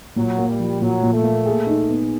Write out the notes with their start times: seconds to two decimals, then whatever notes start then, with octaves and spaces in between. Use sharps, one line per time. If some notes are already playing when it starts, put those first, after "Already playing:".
0.16 A#2 F#3
0.38 A#3
0.49 G3
0.59 F3
0.81 A#2 F#3
1.02 A#2
1.13 A3
1.24 A#3
1.46 G#4
1.67 D#4
1.89 B3